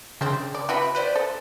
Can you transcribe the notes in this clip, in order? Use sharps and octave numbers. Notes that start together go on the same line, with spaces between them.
C#3 C4 D4
D5
E4 F#4 B4 G5 B5
B4 C5 D5
A4